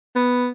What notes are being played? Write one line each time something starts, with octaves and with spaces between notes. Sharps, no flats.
B3